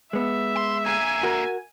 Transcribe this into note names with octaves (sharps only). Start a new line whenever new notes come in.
G#3 B3 E5
C6
D3 A#3 G#5
F#4 A#4